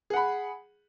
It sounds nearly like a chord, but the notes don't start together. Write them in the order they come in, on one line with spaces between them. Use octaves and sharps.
G#4 F#5 B5